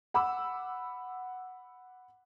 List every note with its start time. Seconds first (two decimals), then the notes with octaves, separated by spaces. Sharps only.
0.14 F#5 B5 D6 E6